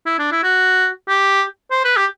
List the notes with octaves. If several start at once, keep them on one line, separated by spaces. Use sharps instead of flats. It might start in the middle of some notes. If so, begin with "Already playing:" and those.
E4
D4
E4
F#4
G4
C5
B4
G4